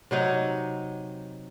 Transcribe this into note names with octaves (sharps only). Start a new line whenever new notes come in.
C3 F#3 D#4